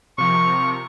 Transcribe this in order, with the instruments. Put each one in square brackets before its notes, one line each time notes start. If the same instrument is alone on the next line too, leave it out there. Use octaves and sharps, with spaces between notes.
[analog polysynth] C3 F3 A#4 [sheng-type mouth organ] C#6